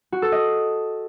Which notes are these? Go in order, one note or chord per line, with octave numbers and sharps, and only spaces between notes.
F#4
A4
D#5